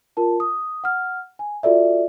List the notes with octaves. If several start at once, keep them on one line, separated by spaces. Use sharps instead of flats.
F4 A#4 A5
D#6
F#5 F6
G#5
F4 F#4 A4 D5 E5